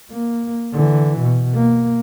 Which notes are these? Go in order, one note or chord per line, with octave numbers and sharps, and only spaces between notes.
A#3
D3 E3
B2
A#3